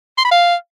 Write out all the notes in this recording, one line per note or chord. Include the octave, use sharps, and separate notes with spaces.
C6
B5
F5